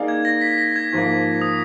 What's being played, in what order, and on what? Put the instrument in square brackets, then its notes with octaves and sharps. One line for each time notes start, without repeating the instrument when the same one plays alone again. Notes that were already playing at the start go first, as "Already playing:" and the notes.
Already playing: [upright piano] A#3 D#4 G#4 D5 F5
[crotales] G#6
A#6
B6
A#6
G#6
[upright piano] G#2 F3 A#3
[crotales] D#6